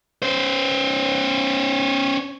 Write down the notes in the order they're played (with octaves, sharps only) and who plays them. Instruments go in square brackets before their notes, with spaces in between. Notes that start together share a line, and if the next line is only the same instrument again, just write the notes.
[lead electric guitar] C#4 C5